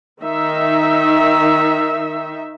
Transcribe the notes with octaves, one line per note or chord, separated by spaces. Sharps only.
D#3 D#4 E5